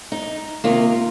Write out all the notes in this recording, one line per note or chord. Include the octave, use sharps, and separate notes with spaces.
D#4
C3 D#3 A#3 F4